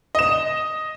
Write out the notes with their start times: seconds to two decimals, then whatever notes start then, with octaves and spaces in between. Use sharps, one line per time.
0.15 D#5 E7